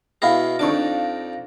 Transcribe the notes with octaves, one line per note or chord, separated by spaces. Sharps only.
B2 E4 G#4 F5 A#6
F2 D4 D#4 D5 C#6 D6